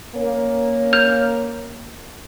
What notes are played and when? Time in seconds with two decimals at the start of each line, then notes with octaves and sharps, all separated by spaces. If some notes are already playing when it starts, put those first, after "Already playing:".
0.15 A#3 C#4
0.93 F6 G6 F7